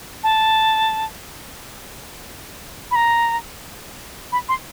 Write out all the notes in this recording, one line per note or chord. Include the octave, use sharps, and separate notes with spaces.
A5
B5
A#5
B5
C6